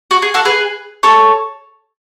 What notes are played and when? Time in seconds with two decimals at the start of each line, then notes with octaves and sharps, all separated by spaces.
0.11 F#4
0.22 G#4
0.34 F#4 A4
0.45 G#4 B4
1.03 A4 C#5